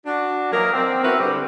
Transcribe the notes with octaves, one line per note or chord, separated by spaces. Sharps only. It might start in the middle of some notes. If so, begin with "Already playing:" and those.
D4 F#4
E3 F#3 A#3 D#4 A#4
C4
B3 C4 E4 F#4 A#4 B4
D3 G3 C4